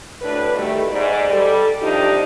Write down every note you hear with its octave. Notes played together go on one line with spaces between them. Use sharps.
D2 A2 D4 B4
E2 B2 D#3 G3 A3
G#2 D5
G3 A4
C3 F3 D4 D#4 F4 G4